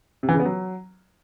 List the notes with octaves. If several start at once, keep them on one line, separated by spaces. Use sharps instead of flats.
C3
E3
C#3
B3
F#3